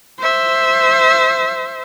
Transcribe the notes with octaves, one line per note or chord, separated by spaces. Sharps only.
C5 E5